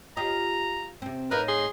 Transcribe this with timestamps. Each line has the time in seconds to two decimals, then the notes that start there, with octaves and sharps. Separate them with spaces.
0.17 F4 G4 D#5 A#5
1.02 C3 C4
1.31 A2 D#4 A#4 B4 F5
1.48 G#4 C6